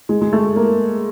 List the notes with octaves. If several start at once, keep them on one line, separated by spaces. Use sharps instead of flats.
G#3
G#3
A3
A#3